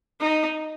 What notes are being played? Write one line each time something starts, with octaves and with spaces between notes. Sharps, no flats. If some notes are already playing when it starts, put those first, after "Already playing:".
D#4